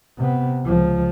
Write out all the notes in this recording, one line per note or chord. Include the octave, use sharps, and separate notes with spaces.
C3 B3
C#2 F3